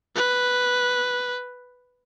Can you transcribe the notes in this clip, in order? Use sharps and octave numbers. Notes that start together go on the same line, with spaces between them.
B4